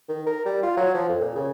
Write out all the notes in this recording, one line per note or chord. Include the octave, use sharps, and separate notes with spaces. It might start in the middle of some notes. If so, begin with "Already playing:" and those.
D#3
A#4
G3
F4
F#3
F3
F2
A#2
C#3